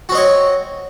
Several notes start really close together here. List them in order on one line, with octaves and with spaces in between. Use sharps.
F#4 C4 D#5 C#5